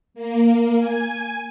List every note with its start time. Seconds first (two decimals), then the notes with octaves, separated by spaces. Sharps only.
0.14 A#3
0.79 G#5